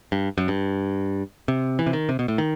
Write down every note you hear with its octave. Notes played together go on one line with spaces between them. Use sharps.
G2
F#2
G2
C3
E3
C3
D#3
C3
B2
A2
D#3